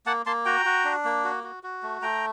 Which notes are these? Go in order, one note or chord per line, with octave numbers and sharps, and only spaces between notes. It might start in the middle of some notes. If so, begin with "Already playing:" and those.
A#3 F#5 A5
A#3 A5 C6
F#4 G5 A#5
F#4
D4
A#3
F#4
F#4
F#4
A3
A3 G5 A#5